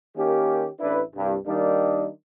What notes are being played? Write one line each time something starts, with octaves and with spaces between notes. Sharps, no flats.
D#3 A#3 C#4 G4
A1 D4 E4 B4
C2 G2
D#3 G3 A#3 D4 D#4